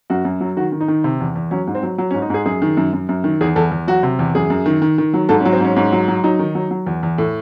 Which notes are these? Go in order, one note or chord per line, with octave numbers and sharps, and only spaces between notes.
F#2 F#4
F#2
F#3
D#3 F#4
D#3
D#4
D#3
C3
E2
E2
F#3 C#4
G#2
C4
F#3
F#3
C#4
G#2
D#4
G#2 G#4
F#2 G#4
D#3
F#2
F#2
F#2
D#3
E2 G#4
E2 A4
E2
F#3 F#4
C3
E2
F#2 G#4
F#2
D#3
D#3
D#3
F#3
G#2 A4
C#4
F#3
C4
G#2 C#4
G#2 C#4
F#3
F#3
F#3 D#4
D#3
F#3
F#3
E2
E2
A2